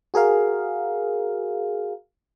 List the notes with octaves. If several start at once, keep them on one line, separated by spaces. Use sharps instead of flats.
F#4 G#4 A#4 F5